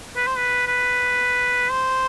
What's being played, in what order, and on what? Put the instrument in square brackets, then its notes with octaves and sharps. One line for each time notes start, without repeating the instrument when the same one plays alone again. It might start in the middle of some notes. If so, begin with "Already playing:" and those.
[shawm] B4
C5
B4
B4
C5